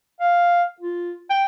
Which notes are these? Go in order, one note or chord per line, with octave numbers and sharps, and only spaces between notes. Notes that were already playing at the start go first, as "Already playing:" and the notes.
F5
F4
G5